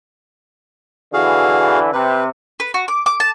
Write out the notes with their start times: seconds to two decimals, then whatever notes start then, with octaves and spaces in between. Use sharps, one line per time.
1.13 D3 E3 F#4 G#4 F5
1.93 C3 B4
2.60 B4
2.74 F#4
2.88 D6
3.06 D6
3.20 A5